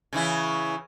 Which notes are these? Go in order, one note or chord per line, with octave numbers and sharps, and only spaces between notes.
C#3 E3 E4